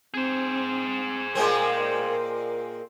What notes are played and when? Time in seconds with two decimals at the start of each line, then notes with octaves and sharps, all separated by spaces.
0.14 C4 G#4 C5
1.35 A#2 G#3 C4 A#4